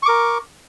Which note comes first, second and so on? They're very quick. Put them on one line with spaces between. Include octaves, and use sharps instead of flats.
C#6 D6 A#4